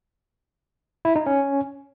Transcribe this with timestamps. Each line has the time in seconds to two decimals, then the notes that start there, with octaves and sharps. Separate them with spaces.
1.05 E4
1.16 D#4
1.26 C#4